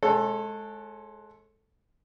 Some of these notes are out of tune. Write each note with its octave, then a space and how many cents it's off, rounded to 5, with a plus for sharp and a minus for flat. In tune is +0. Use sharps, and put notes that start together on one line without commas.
G#3 +25 A4 +5 C#5 -25